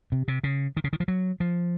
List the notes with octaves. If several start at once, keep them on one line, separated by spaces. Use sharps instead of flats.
C3
C3
C#3
D#3
C#3
D#3
F3
F#3
F3